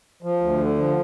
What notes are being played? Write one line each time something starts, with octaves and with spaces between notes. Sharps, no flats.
F3
D2
D3
F3